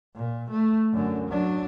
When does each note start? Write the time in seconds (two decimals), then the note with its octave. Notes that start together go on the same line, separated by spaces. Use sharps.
0.15 A#2
0.51 A3
0.93 F#2 D3
1.28 F#3 D4